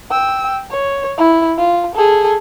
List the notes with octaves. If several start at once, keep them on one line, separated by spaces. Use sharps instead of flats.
G5 E6
C#5
E4
F4
G#4 A4